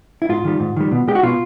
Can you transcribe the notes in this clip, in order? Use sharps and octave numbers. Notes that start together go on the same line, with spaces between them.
E4
G#2 F4
D#3 G3
G#2
D#3 G3
B2
G#3 G4
F#4
B2 F4